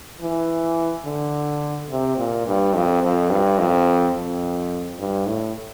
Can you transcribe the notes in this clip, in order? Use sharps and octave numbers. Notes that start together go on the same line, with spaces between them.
E3
D3
C3
A#2
G2
F2
F2
G2
F2
F2
G2
A2